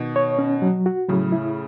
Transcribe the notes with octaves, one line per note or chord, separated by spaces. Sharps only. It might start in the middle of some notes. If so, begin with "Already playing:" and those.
Already playing: B2 D#3
C#5
C#4
F#3
F#4
A2 C#3 F#3
E4